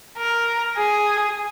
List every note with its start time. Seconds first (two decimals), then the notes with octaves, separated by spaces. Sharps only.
0.18 A#4
0.77 G#4